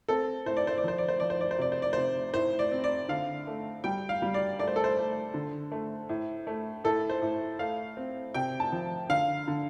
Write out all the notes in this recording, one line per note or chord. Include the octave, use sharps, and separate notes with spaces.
C4 A4
A2 C5
D5
C5
D5
F3 C5
D5
C5
F3 D5
C5
D5
C5
C3 D5
C5
D5
C3 C5
A2 C5
D5
C4
D5
D3 F5
A3
G3 G5
F5
G3
D5
A3 D5
C5
A4
C5
A3
D3
A3
A2
A3
A2 A4
C5
A2
A3 F5
C4
C3 G5
A5
F3
D3 F5
D3